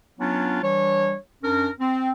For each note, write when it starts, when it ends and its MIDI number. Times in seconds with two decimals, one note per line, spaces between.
0.20 0.61 54
0.20 0.61 59
0.20 0.61 61
0.20 0.61 62
0.20 0.61 65
0.62 1.14 52
0.62 1.14 55
0.62 1.14 62
0.62 1.14 73
1.43 1.70 42
1.43 1.70 61
1.43 1.70 62
1.43 1.70 70
1.80 2.11 60